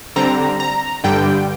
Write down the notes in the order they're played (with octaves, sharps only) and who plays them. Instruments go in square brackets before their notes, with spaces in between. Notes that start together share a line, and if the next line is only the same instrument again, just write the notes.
[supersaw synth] D3 G3 C4 A#5
A#5
G2 D3 G3 G5